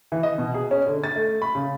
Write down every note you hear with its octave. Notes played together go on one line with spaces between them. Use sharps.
E3
D#5
B2
G#4
C#4
D3
A6
A3
B5
C#3